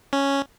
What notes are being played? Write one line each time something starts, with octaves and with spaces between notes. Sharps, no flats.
C#4